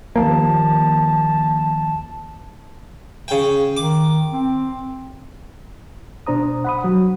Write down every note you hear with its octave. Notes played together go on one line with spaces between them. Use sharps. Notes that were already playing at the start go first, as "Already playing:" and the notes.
D#2 F3 A#3 A5
C#3 G5
D#3 D6
C4
B2 D4 C5 A#5 D#6
F#5 B5 D#6
F#3